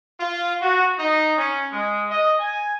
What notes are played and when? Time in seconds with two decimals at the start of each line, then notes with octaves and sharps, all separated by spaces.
0.20 F4
0.61 F#4
0.98 D#4
1.36 C#4
1.72 G#3
2.10 D#5
2.40 G#5